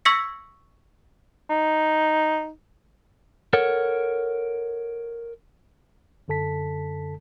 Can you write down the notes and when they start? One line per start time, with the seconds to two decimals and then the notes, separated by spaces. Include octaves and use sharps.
0.05 C#6 E6 G#6 A#6 B6 C#7
1.50 D#4
3.53 A4 A#4 C#5 F#5
6.28 F#2 D3 A4 A5 B6